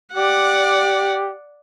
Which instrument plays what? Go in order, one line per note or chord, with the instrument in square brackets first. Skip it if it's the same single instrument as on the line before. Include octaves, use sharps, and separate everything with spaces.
[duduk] G4 [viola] D5 F#5